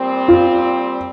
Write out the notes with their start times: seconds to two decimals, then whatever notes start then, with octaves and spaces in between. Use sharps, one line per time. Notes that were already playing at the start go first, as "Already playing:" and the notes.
Already playing: A#2 G3 C4
0.28 F4